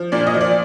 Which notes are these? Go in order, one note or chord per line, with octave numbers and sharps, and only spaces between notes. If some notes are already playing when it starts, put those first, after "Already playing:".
Already playing: F3
A#2 D5
D#5
F3
D5